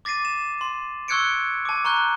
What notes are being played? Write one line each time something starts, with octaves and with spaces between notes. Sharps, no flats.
D6 A6 A#6 C7 D#7
E7
C6
C#6 E6 F#6 G#6 C#7 D7
A5 D6
A#5 C#6 F#6 G6